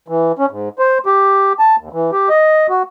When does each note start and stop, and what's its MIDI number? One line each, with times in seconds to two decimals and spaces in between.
0.08 0.32 52
0.39 0.46 61
0.51 0.69 44
0.79 0.98 72
1.06 1.53 67
1.59 1.76 81
1.79 1.89 39
1.93 2.11 52
2.12 2.29 67
2.29 2.67 75
2.69 2.83 66